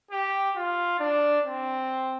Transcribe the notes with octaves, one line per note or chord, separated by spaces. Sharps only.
G4
F4
D4
C4